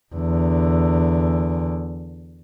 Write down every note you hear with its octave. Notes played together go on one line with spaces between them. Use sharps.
E2 D3